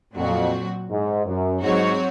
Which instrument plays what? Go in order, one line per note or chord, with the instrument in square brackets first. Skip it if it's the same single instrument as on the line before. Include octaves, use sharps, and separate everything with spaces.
[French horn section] F2 [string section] A#2 F#3 C4 F#4
[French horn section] G#2
F#2
[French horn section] G#2 [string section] F#3 C4 F#4 C#5